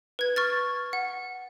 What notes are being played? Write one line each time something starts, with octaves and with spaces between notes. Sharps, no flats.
B4 G#6
C#6 F6 A6
F#5